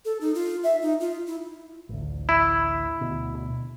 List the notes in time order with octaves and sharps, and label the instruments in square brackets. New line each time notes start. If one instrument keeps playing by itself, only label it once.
[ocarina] A4
D#4
F4
E5
D#4
F4
E4
[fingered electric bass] A1 D2
[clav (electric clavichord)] E4
[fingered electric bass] D2 B2